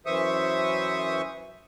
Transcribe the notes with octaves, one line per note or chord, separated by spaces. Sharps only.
F#2 E3 C5 E5 C#6 D#6